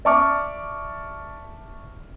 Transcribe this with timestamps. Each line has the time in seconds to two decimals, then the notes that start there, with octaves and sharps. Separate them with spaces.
0.05 D5 E5 A5 C#6 D6 F6